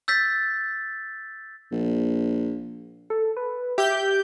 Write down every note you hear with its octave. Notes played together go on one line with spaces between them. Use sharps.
E6 G6 A6 B6
A#1
A4
B4
G4 E5 G6